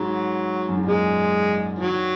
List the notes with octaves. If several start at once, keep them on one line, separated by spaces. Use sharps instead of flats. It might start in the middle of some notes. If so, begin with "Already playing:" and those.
Already playing: G#2 F#3
F#2
G#2
A#2 G#3
D#3 F#3
D#3